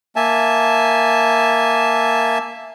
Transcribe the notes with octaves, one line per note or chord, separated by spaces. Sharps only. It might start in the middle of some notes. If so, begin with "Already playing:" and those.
A#3 E5 G#5 A5